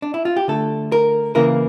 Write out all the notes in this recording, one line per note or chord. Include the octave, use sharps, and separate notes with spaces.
D4
E4
F4
G4
D3 A3 A4
A#4
C#3 E3 A#3 A#4